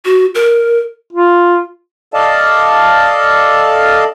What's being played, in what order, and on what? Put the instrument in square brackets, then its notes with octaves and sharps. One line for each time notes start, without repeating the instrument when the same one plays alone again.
[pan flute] F#4
A#4
[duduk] F4
[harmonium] A4 D5 D#5 F5 A5